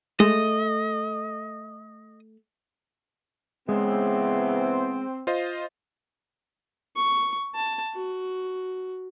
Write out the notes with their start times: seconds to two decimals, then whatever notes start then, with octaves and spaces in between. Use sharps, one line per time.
0.20 G#3 A3 D#5
3.69 C#3 E3 G#3 B3 C4
5.27 F4 C5 D#5
6.96 C#6
7.55 A5
7.95 F#4